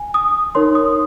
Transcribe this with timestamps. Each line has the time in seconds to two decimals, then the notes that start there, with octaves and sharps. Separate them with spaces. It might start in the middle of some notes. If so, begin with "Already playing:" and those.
Already playing: G#5
0.14 D#6
0.55 D#4 A#4 C#5 C6
0.75 D#6